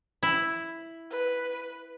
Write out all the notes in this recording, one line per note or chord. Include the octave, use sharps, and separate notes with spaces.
E4
B4